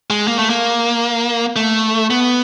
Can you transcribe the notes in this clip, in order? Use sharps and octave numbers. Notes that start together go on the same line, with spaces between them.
G#3
A#3
A3
A#3
A3
B3